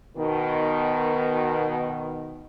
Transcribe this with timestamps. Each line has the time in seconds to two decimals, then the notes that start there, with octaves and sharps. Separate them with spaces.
0.17 B2 D#3